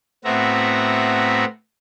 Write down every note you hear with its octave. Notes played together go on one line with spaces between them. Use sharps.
A2 B3 C4 F#4 E5 A#5